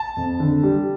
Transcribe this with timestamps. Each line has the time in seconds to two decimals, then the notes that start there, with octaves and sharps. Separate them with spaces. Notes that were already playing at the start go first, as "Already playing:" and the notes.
Already playing: A5
0.17 F2
0.40 D3
0.63 G3